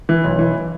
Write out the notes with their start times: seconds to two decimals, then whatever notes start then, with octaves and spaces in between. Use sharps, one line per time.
0.09 E3
0.24 B1
0.39 E3